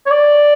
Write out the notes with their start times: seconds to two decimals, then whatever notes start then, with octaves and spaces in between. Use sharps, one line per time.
0.06 C#5
0.10 D5